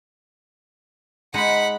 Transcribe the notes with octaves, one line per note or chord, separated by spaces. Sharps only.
G#3 D#4 F#5 B5